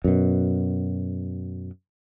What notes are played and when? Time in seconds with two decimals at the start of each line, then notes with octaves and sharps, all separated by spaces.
0.04 F#2 B2